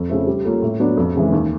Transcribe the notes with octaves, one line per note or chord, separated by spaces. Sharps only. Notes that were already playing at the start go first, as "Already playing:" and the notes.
Already playing: F2
C#3 F3 A3
G3
A#3 C#4 F4 A4
A2
F#3 B3 D4
F2
C#3 E3 G#3
D#2